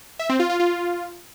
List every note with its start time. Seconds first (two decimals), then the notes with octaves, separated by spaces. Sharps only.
0.19 E5
0.29 C4
0.40 F4
0.50 F4
0.60 F4